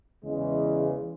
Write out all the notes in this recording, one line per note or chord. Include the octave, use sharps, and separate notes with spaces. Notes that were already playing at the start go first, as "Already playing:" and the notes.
E2 C#3 E3 G#3